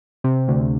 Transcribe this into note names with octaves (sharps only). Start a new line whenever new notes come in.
C3
D2